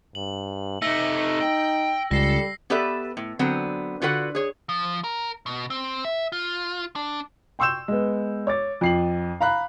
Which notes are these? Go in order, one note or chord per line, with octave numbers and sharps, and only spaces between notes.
G2 F#7
C3 A3 D#4 E6 A#6 F#7
G5
C#2 G3 A4 A#6 C7
B3 G4 A4 B4 D5 E5
A2
D3 F#3 B3 C4
D3 F4 F#4 B4 F#5
G#4 C#5
F3
A#4
B2
C4
E5
F4
D4
G5 C6 C#6 E6 G6 E7
G#3 B3
C#5 D6 A6
F2 C7 F#7
F5 A#5 B5 F#6